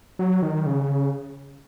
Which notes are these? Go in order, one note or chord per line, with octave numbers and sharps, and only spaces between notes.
F#3
D#3
C#3